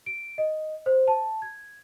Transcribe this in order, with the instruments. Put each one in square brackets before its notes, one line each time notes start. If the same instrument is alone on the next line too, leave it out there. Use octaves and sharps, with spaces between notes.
[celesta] D7
D#5
C5
A5
G#6